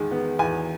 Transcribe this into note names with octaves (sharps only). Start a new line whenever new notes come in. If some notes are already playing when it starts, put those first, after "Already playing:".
Already playing: E2 D#3 G#3
B3
E2 G#5